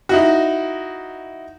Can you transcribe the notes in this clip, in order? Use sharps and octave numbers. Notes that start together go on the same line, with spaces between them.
D#4 E4 F#4